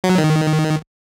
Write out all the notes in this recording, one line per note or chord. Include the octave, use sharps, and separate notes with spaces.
F#3
D#3